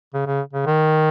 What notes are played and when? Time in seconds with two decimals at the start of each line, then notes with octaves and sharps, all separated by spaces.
0.14 C#3
0.27 C#3
0.53 C#3
0.66 D#3